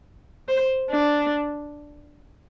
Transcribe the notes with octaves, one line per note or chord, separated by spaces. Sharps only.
C5
D4